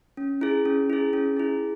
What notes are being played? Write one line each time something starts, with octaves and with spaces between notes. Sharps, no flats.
C#4
E4 G#4
C#4
E4 G#4
C#4
E4 G#4